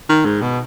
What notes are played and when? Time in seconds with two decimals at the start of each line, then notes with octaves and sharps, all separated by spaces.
0.09 D#3
0.25 G#2
0.42 B2